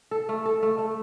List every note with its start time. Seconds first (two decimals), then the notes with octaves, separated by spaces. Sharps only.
0.11 A4
0.29 A3
0.46 A4
0.63 A3
0.78 A3